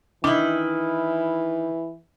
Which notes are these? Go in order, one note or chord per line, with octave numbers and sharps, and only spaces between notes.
D#3 E3 D4 E4